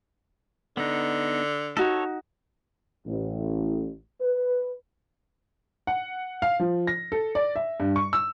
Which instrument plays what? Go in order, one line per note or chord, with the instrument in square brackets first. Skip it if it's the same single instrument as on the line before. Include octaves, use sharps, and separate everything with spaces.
[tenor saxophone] D3 [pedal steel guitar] B3 D#4
[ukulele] D#4 F#4 [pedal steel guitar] A4 C#5
[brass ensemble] A1
B4
[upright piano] F#5
F5
F3
A#6
A4
D5
E5
G2
C#6
E6